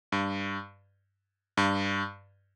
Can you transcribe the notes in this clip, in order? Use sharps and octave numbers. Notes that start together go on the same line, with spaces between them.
G2
G2